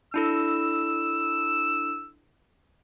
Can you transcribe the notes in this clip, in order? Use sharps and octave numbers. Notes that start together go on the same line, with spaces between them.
D4 E4 A4 E6